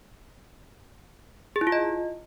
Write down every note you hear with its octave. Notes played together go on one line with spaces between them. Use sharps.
G#4
E4
F4
D#5